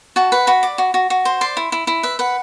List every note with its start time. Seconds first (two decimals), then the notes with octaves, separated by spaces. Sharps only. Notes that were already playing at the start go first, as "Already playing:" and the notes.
0.16 F#4 A5
0.32 B4 F#5
0.47 F#4 B5
0.63 D5
0.78 F#4
0.94 F#4
1.10 F#4
1.25 C5
1.41 D5 C6
1.57 E4
1.72 E4
1.87 E4
2.03 B4 E5
2.19 B4 F#5